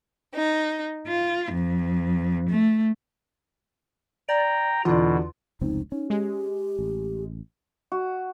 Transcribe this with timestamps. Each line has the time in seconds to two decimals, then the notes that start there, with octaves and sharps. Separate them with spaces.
0.35 D#4
1.08 F4
1.53 F2
2.49 A3
4.29 D5 G5 A#5
4.85 E2 B2 D3 F4 D5
5.61 F1 C#2 C4 D#4
5.92 C#4 D#4
6.10 G#3 G4
6.79 A1
7.92 F#4